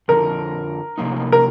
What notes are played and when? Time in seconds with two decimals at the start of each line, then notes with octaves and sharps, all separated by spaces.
0.08 F2 D3 F3 A#4
0.98 C3 F3 A#3 D#4
1.32 A#4